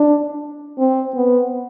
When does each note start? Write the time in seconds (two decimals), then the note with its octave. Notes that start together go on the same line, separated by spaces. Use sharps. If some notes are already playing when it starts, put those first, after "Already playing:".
Already playing: D4
0.79 C4
1.15 B3